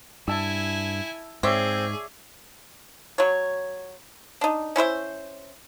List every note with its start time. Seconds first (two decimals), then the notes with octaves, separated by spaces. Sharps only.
0.28 G2 E4 G#5 A5 E6
1.43 G#2 C4 G#4 C#5 D5 E5
3.18 F#3 C#5
4.41 D4 D#4
4.76 C#4 E4 C5 E5